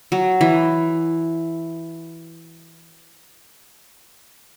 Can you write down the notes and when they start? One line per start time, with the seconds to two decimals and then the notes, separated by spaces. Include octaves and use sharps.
0.12 F#3
0.41 E3